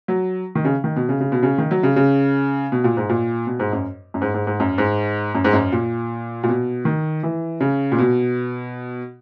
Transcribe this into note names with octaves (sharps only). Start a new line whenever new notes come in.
F#3
D#3
C#3
D#3
B2
C#3
C#3
B2
C#3
D#3
F#3
C#3
C#3
B2
A#2
G#2
A#2
B2
G#2
F#2
F#2
G#2
G#2
G#2
F#2
G#2
F#2
G#2
F#2
A#2
A#2
B2
D#3
E3
C#3
A#2
B2